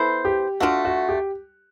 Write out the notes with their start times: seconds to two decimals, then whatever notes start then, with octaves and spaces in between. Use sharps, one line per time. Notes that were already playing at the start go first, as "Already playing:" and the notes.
Already playing: B3 E4 A4 C5
0.25 G4
0.60 A3 D4 F4 F#4
0.85 F#4
1.09 G4